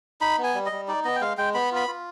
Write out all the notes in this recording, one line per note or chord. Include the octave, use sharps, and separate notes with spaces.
D#4 B5
B3
G#5
G3
D#5
G3
D#4 D5
B3 D#5
G5
G#3 F5
G#3 G5
B3 B5
F4 B5
F4